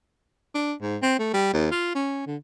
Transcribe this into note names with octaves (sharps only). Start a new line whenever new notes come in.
D4
G#2
C4
A3
G3
D#2
F4
C#4
D3